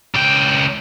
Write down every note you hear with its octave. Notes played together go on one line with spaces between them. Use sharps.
C#2 G5